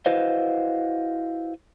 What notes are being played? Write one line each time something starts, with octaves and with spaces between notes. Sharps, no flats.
E4 F#4 B4 C5 D#5 F5